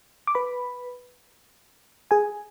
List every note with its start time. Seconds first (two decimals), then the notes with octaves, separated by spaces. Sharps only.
0.27 D6
0.35 B4 B5
2.11 G#4 G#5